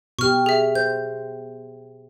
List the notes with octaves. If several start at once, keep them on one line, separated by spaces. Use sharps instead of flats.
B2 G4 C#6 F6
G#4 E5
C5 G6